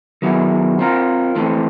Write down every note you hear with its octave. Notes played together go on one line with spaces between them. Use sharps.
D#3 F#3 B3 E4 G#4
C4 F4 A#4
E3 A3 C4